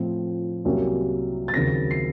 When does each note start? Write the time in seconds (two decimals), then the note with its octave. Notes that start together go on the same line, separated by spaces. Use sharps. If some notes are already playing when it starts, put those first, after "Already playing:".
Already playing: A2 F3 C4
0.65 C2 C3 F#3 A#3 C#4
1.48 A6
1.53 D#2 C#3 F#3 C4 A#6
1.91 C7